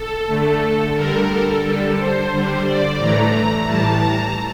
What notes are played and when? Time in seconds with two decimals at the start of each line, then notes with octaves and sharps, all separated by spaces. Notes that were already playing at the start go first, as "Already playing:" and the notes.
Already playing: A4
0.27 D3 A3
0.95 D3 G3 A#4
1.29 A4
1.64 D3 G3
1.98 C5
2.31 D3 G3
2.65 D5
2.98 A2 E3 A3 A#5
3.67 A2 E3 G3 A5
4.01 A#5